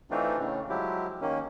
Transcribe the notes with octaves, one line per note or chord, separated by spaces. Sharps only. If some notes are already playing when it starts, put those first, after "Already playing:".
E3 A3 C4 D4 D#4 F4
A2 C#3
F3 F#3 G#3 E4 G4
D#3 A#3 C#4